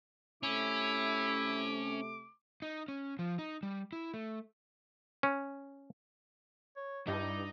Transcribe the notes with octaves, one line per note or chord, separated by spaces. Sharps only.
C3 A3 C#4 E4 D6
D#4
C#4
F3
D#4
G3
E4
A3
C#4
C#5
G2 D#4 E4 D5